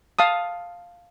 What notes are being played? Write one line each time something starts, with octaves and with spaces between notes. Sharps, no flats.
F5 A5 D#6